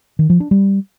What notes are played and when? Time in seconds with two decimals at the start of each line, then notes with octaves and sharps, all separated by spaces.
0.19 D#3
0.30 F3
0.40 D4
0.51 G3